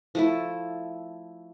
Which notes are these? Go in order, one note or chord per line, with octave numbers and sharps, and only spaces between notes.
F3 A3 E4